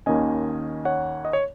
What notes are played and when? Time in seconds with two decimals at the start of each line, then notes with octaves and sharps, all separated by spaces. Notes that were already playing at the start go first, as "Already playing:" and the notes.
0.06 D#2 D#3 A#3 C#4 D#5 G#5
0.85 C#5 F#5
1.25 D#5
1.33 C#5